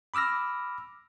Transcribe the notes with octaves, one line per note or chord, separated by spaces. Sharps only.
B5 D6 E6 F6 A#6